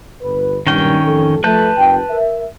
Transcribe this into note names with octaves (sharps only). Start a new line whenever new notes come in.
G1 B4
B1 G2 A#2 D#3 C#4 G5
A1 F2 A4
F3 A3 B4 A5 G6
F#1 G5
A#4 E5